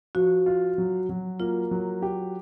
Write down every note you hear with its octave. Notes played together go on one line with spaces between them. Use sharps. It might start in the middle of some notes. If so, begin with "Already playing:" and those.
F3 F#4
F4
F#3
F#3
A#3 F4
F#3
G4